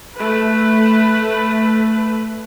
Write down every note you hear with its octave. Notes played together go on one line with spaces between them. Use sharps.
A3 B4